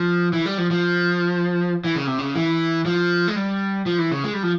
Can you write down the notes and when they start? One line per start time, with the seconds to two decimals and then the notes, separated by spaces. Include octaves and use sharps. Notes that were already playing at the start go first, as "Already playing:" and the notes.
Already playing: F3
0.33 E3
0.46 G3
0.58 F3
0.71 F3
1.84 E3
1.96 C#3
2.07 C3
2.19 C#3
2.35 E3
2.86 F3
3.28 G#3
3.36 G3
3.86 F3
3.98 E3
4.12 C#3
4.24 G#3
4.34 G3
4.43 F3